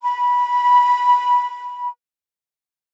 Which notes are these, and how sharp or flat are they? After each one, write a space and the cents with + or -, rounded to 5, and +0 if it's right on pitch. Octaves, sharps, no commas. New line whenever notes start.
B5 -15